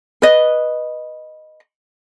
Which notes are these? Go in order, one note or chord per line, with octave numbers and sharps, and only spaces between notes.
B4 D#5